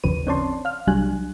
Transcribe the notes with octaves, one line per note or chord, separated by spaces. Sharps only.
G1 D#2 C#3 F3 B4 D#7
C4 C#4 C#5 D5 A5 C6
F5 F6
C2 F#3 G3 D4 G#5 F#6